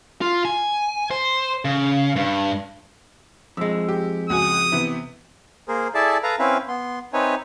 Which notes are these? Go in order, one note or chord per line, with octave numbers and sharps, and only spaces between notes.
F4
G#5
C5
C#3
G2
F2 G#3 E6
G4
C#2 F#4 G#5 D#6
C3 E3 B3
A#3 G#4 A#4 C5
E4 G#4 A4 D5 E5 A5
A4 B4 F5 A#5
C4 C#4 E4 B4 E5 F5
B3 C6
C4 D#4 B4 C#5 E5 G#5